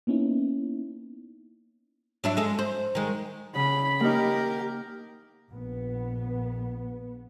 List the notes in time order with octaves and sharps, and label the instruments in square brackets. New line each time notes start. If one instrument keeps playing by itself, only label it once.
[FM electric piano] A#3 B3 C#4 D#4 E4
[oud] F#3 D4 E4
G#3 A4
C5
D#3 G#3
[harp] C#3 [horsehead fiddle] B5
[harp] A#3 D#4 [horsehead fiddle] G4 A#4
[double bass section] A#1 B3